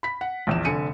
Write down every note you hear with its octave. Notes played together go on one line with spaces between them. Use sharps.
B5 B6
F#5
A#1 E2 E7
F1 D3 G#5 C#7 D#7